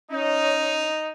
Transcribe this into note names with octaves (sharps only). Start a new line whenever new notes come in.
C#4 D#4